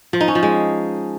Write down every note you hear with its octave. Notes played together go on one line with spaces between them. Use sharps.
F3
D#4
C#4
F3
G#3